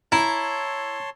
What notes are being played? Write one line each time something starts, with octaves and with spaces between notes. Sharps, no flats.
E4 C#5 A5 A#5 C6